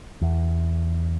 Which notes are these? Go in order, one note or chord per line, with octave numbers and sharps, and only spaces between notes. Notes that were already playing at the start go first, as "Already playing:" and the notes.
E2